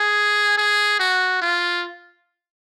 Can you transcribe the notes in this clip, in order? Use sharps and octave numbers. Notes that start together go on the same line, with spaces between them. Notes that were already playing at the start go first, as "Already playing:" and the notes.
Already playing: G#4
G#4
F#4
F4